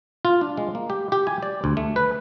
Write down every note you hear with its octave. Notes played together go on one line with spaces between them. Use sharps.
F4
D4
G#3
A#3
G4
G4
G#5
D5
D2
A3
B4